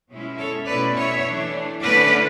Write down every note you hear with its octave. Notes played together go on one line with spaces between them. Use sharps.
B2 G#3 C#4 E4
A4 C#5
B2 A3 C#4 E4 B4 D5
C#5 E5
E3 A3 D4
D3 A3 C#4 E4 B4 D5